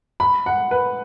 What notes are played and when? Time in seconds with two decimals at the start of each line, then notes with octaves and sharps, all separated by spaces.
0.20 B5
0.46 F#5
0.71 B4